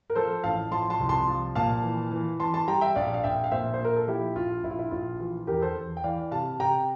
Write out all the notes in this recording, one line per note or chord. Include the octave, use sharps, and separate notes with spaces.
A#4
F3 A4 C5
A1 F5 A5
F3 A5 C6
A5 C6
C2
A5 C6
F3
A#2 F5 A5
E3
E3
E3 A5 C6
A5 C6
G3 G5 A#5
E5 G5
A#1 D5 F5
F5
A#1 E5 G5
F5
A#2 C5 E5
C5
A#2 A#4
A4
F3 E4 G4
A#1 F4
A#1 E4
F4
E4
A#1 F4
E3 F4
E2 G4 A#4
A4 C5
E2
G5
E3 D5 F5
C3 F5 A5
C3 G5 A#5